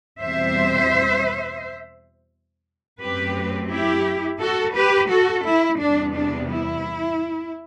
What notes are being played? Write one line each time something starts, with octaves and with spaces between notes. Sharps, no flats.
E2 B2 G3 C4 C5 E5
F#2 F#3 A3 C4 G4 B4
E4 G4
F#4 A4
G4 B4
F#4 A4
E4
E2 C3 G3 B3 D4
D4
E4